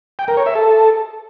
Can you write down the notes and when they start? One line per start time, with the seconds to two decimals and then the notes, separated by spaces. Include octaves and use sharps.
0.19 G5
0.28 A#4
0.37 C#5
0.46 E5
0.55 A4